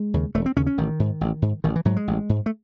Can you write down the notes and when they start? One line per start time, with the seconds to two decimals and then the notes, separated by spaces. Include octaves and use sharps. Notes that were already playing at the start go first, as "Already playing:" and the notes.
Already playing: G#3
0.14 D#2 C#3
0.35 E1 A3
0.46 C4
0.56 D#2 C#3 C#4
0.67 C#4
0.78 A1 D#3
1.00 G#2
1.21 A1
1.42 G#2
1.64 A1 D#3
1.76 E3
1.85 G#2 F#3
1.96 G#3
2.07 A1
2.29 G#2
2.46 A3